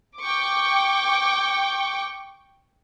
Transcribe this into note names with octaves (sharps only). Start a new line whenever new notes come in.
G5 C#6 D6